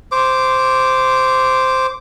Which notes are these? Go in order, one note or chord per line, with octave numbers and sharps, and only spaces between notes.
C5 D6